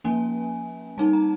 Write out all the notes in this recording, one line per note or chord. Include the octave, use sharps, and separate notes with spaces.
F3 A#3 C#4 G#5
G3 C4 D#4 A5
A#5